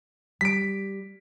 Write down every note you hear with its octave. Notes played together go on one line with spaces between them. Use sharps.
G3 B6 D7